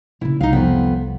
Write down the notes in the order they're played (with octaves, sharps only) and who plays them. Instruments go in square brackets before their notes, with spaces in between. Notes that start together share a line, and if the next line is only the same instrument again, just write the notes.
[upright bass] A#2 C#3 [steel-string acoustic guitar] E4
[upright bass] C2 [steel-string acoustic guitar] D#4 F5
[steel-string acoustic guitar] F2 B3